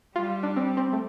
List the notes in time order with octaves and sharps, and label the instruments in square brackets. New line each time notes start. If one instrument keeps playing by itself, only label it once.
[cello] G3 [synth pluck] F4
[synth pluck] D4
C4
C4
A3